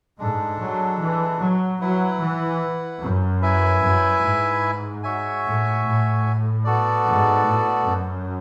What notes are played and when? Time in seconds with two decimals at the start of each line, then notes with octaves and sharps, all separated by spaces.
0.18 G#2 G#3 D4 A4
0.59 F#3
1.00 E3
1.40 F#3
1.81 F#3 E4 B4 F#5
2.20 E3
3.01 F#2
3.42 E4 B4 E5 G#5
3.82 F#2
4.22 G#2
5.03 F#4 C#5 E5 G#5
5.43 A2
5.84 A2
6.64 B3 F#4 A4 D5
7.05 G#2
7.45 A2
7.86 F#2